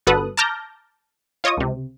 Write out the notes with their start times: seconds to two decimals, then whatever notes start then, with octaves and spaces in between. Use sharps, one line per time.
0.07 G1 F#4 A4 B4 D#6 F#6
0.37 A5 A#5 D6 F6 G6 A#6
1.44 F4 C#5 D#5 C#6 D#6
1.57 C#2 C3